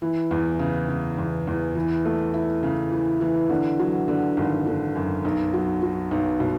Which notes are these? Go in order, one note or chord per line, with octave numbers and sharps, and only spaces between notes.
E3
E2
C#3
C#3
E2
E2
E3
A3
E4
C#3
E3
E3
D3
F#3
D3
G#1
D3
F#2
B1
F#3
F#3
B1
B2